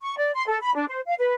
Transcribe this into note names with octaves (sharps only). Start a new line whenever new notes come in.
C#6
D5
C6
A4
B5
D4
C5
F5
B4